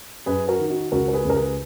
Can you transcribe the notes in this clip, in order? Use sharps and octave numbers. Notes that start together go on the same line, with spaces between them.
F#2 G#4 B4
F#4 A#4
D#3
D#4 F#4
C#2 F#4 A#4
A#4
G#4 B4
C#2 A#4
G#4 B4